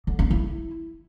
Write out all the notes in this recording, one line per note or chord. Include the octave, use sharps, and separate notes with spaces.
D3
C#4
E4